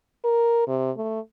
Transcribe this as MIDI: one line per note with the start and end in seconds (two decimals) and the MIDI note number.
0.24 0.64 70
0.67 0.91 48
0.97 1.20 57